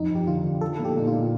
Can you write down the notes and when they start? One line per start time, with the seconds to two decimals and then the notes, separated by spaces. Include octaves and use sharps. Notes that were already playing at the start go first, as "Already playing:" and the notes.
Already playing: F2 D#4
0.10 F2 G4
0.27 D3 F4
0.44 D3
0.61 F3 A4
0.79 A#2
0.85 G4
0.96 A#2 D#4
1.07 F4
1.12 A#2